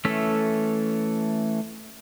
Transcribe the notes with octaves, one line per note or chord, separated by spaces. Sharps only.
E3 A3 C#4 A4 E5